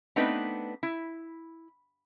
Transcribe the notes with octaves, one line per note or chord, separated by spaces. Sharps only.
A3 B3 C4 D4 D#4 B4
E4